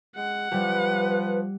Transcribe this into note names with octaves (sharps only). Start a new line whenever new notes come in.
G#3 F#5
F3 G3 G4 B4